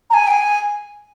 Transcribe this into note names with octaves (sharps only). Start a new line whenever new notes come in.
A#5
G#5
G5
G#5